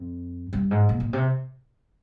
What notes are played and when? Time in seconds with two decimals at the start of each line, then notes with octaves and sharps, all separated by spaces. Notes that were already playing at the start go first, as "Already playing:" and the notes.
Already playing: F2
0.53 G2
0.71 G#2
0.89 A#2
1.00 A#2
1.13 C3